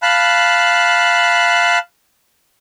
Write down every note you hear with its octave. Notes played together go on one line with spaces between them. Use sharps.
F5 A5 B5 F#6